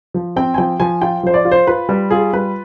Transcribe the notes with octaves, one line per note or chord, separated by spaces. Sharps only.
F3
C4 G5
G#5
F3 G5
F3 G#5
F4 G5
F3 C5
D5
F4
C5
F4 B4
G3 B4
F4 G#4
G3 B4